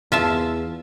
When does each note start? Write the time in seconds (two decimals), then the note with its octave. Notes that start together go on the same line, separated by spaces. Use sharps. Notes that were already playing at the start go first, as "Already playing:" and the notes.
0.12 E2 F4 E5 A5